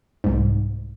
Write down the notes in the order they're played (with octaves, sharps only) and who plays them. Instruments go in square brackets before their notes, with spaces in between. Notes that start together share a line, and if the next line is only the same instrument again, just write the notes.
[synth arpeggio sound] C2 G#2